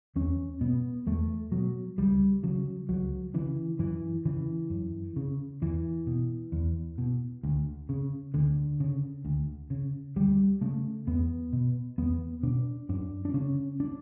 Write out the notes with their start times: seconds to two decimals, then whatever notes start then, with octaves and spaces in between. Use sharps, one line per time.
0.16 E2 C#4
0.61 B2 B3
1.06 E2 A3
1.52 B2 F#3
1.98 C#2 G3
2.43 C#3 F#3
2.89 C#2 F#3
3.34 C#3 E3
3.79 F#2 E3
4.25 C#3 E3
4.70 F#2
5.16 C#3
5.62 E2 E3
6.07 B2
6.52 E2
6.98 B2
7.43 D2
7.89 C#3
8.34 D2 D3
8.80 C#3
9.25 D2
9.70 C#3
10.16 D2 G3
10.61 C#3 A3
11.07 E2 B3
11.53 B2
11.98 E2 B3
12.43 B2 D4
12.89 F#2 D4
13.25 D4
13.34 C#3 C#4
13.80 D4